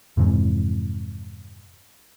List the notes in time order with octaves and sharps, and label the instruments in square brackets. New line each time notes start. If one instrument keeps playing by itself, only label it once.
[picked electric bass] F2 G#2 C3 E3